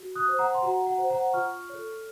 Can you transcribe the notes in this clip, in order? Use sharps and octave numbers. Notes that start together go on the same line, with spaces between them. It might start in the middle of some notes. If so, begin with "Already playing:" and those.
Already playing: F#4
D#6 F#6
C5
F#5 A#5
C6
F#4 F#5 A#5
F#5 A#5
C5
F#5 A#5
F4 C#6 F6
A4 C#5